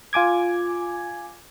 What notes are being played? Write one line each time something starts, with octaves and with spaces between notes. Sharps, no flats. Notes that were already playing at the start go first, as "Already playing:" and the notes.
F4 G#5 D6 G#6